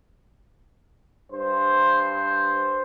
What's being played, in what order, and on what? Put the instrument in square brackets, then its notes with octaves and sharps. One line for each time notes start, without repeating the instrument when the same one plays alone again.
[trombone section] G2 C5